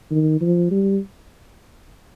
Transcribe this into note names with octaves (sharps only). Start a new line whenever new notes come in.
D#3
F3
G3